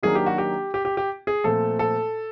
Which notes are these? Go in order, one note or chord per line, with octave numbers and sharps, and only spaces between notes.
D#3 F#3 A#3 D4 G#4
G4
F#4
G4
G4
G4
G4
G#4
A#2 F3 A3 C4 A4
A4